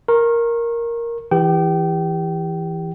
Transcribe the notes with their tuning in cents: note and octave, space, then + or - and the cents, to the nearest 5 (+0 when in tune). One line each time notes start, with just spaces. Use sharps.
A#4 +0 C#6 -35
E3 +0 G4 +25 G5 -25